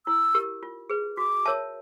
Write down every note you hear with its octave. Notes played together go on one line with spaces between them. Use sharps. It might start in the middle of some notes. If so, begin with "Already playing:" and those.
E4 E6
G4 A#4
F4
G#4 B4
F#4 D6
A#4 C#5 E5 A5